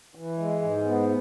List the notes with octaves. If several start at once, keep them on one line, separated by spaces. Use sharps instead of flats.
E3
G#3
G#2
B3